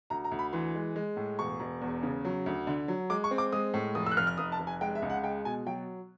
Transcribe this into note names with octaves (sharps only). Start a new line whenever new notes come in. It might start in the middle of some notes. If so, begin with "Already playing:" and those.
D2 A#5
A#5
D2
B5
E3 C6
G#3
G#3
A2
E1 C#6
E1
E2
C#3
F#3
D2
D3
F#3
G#3 D6
C#6
C4
D6
G#3 D#6
A2
F1 D#6
E6
F#6
F1 F6
F6
F1 D#6
A5
F1
G#5
G#3 G5
E5
C#2
F#5
G#3 G5
B2 G#5
F#3 G5